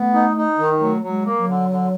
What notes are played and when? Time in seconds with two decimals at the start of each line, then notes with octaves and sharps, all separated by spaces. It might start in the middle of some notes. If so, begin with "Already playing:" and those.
Already playing: A3 B3
0.14 D#4
0.37 D#4
0.58 D#3
0.79 F#3 A3
1.02 F#3
1.09 G#3
1.24 A#3
1.38 F#3
1.46 D3
1.69 D3